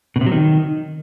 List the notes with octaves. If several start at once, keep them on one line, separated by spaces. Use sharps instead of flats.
B2
C3
F#3
D#3